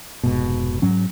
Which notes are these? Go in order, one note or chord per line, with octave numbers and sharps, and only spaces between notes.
F1 G#2 B2
G#2 F#3 C#4